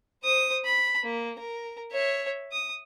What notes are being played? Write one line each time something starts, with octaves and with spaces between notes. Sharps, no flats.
C5 D#6
B5
A#3
A#4
C#5 E5
D#6